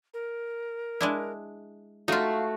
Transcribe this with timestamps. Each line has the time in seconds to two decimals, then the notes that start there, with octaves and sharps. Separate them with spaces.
0.14 A#4
1.01 G#3 D4 E4
2.08 A3 D#4 F4 F#4 F5